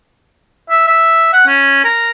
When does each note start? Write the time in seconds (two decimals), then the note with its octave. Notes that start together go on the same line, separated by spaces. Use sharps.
0.70 E5
0.88 E5
1.33 F#5
1.47 C#4
1.84 A#4